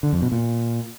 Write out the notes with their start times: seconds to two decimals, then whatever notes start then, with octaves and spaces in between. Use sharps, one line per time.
0.03 D3
0.13 F2
0.22 B2
0.32 A#2